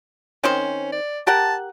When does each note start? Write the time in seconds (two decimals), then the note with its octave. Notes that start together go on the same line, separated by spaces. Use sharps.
0.44 D#3 C4 C#4 C5
0.92 D5
1.27 G4 A#4 F#5 A5